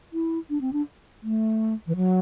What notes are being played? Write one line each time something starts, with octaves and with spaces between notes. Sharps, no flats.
E4
D4
C4
D4
A3
E3
F#3